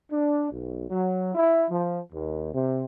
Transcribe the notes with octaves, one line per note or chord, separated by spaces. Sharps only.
D4
B1
F#3
E4
F3
D#2
C3